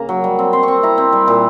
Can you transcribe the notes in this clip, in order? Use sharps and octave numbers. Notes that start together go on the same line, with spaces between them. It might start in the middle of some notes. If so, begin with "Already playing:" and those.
Already playing: C#3 A#3 A#5
F#3
G3
C4
C4 C6
C4 C#6
E4 A#5
C4
G3
A#2